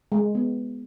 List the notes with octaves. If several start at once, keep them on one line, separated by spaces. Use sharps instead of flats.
G#3
B3